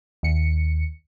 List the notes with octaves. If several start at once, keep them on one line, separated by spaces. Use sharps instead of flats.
D#2 C#7